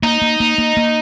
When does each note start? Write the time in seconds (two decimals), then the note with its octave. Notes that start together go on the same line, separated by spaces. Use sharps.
0.03 A#3 D#4
0.22 A#3
0.40 A#3
0.58 A#3
0.77 A#3